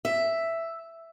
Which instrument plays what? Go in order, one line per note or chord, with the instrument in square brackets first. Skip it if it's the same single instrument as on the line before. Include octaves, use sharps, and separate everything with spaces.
[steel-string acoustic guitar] E5